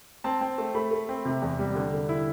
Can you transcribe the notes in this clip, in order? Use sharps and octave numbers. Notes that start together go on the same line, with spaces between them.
C4 A5
C4
A3
A3 B5
A3
C4
C3
E2
G3
D3
D3
E4